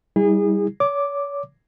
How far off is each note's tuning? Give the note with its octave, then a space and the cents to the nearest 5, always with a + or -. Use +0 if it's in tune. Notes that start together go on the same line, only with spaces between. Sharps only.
G3 +0 E4 -30 G#4 -30
C#5 +35 D6 +0